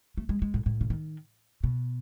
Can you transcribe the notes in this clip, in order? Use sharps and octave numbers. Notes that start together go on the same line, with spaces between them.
A3
G#3
G#3
A2
A2
C#3
D#3
B2